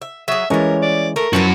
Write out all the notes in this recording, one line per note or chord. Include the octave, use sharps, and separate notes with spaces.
E5
F#3 G#4 E5
E3 G3 G#3 C#4 A#4 C#5
D5
A3 A#4
F#2 F3 E4 F#4 B4